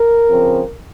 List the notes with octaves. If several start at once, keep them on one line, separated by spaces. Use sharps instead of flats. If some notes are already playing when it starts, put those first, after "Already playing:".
Already playing: A#4
C#3 F3 C4